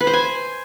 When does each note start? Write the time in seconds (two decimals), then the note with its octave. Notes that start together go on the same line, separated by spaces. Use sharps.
0.01 B4
0.07 C5
0.13 G#5